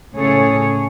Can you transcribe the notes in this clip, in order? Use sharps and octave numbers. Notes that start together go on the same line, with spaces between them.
A2 C#3 G#4 A4 C#5